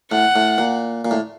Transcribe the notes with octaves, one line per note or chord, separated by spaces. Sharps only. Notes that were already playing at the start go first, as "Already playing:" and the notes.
A2 F#5
A2
A#2
A#2
A2